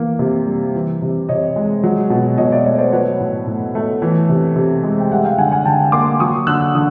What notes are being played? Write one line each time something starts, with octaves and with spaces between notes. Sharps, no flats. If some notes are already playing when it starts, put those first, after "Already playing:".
Already playing: E3 A#3
C3
G3
E3
C3
C3 C#5 D#5
G#3
F#3
B2
B2 C#5 D#5
D5 E5
A3 C#5 D#5
C5 D5
F#3 B4 C#5
A2
A2
A3
E3
C3
C3
G#3
G5
G3 E5 F#5
F5 G5
D3 F#5 G#5
F#5 G#5
D3 G5 A5
A#3 C6 D6
F#3 C#6 D#6
D3 E6 F#6
D3 D#6